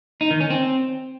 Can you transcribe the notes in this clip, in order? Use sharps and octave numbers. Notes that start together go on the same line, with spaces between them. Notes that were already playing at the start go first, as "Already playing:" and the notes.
D#4
D#3
C#4
C4